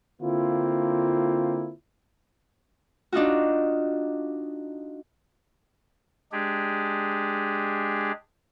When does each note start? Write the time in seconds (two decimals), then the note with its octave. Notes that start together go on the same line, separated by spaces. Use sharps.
0.22 D3 A#3 C4 E4 F4
3.12 D4 D#4 F4 F#4
6.32 G#3 D4 G4 G#4